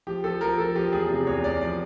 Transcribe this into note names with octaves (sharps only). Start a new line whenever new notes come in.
F3 G4
F3 A4
F3 A#4
F3 A4
F3 G4
E2 G#4
C3 G#4
E2 C#5
E2 D5
F3 D5